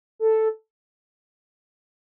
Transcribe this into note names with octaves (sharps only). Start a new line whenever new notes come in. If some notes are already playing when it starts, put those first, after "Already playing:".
A4